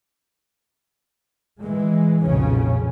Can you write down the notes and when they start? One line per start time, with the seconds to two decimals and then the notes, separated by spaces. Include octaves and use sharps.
1.60 E3 G#3
2.23 B1 F2 A#2 C#3 C#4